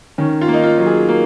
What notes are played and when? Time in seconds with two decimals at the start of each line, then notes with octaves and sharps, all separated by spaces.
0.18 D#3 C#4
0.41 F4
0.48 A#3
0.53 D#4
0.64 F4
0.78 F#3
0.86 G#4
1.09 A#3